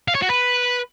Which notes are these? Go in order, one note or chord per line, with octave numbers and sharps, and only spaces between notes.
F5
C#5
F#4
B4